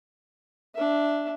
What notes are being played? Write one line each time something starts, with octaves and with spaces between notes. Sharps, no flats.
D4 E5